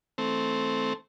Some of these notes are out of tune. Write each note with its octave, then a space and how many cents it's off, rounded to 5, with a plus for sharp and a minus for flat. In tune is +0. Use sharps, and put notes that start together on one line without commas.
E3 -40 A3 +0 C4 +0